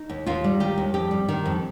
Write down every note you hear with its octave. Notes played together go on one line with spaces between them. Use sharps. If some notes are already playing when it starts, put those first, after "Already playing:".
Already playing: D#4
D#2
D#2 F4
G3
D#3 G4
D#2
F2 G4
G3
D#3
F2